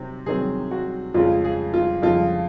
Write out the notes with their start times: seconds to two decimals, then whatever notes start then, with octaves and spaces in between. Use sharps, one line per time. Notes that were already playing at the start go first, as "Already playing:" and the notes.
Already playing: C3 D#3 F#3 C4
0.26 C3 D#3 F#3 C4 G#4
0.71 F#4
1.14 F2 C#3 F3 G#3 F4
1.44 G#4
1.74 F4
2.02 F2 C#3 F3 G#3 F4